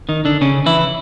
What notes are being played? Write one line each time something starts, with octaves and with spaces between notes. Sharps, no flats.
D#3 D#4
D3 D4
C#3 C#4
E3 E4